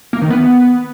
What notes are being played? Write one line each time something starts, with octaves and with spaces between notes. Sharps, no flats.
A#3
D#3
B3